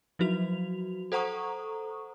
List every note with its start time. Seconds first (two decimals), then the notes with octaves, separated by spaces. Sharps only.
0.19 F3 F#3 F#4 F7
1.12 A4 C5 F#5 A#5 C#6 D#6